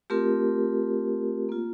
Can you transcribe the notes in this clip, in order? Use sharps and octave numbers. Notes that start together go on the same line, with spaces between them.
A3 C4 F4 G4 A#4
A#3 F4